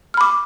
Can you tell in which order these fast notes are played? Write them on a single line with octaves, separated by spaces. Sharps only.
F6 B5 D6